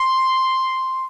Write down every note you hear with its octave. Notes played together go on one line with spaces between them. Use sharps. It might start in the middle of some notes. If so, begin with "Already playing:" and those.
Already playing: C6